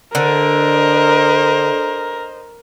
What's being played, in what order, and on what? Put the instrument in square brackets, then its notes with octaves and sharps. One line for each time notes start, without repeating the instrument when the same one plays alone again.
[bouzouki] D3 [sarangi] A#4 [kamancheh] C5 D#5